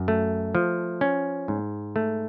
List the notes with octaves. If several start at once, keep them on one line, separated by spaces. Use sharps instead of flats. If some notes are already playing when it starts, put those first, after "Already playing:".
Already playing: F#2
A3
F3
C#4
G#2
A3